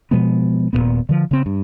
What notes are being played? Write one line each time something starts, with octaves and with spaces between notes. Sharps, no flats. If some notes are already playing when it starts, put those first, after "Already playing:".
B2 F3 G#3 B3
D#1 F#2 A#2 B3
D3 F3
C#3 C4
G2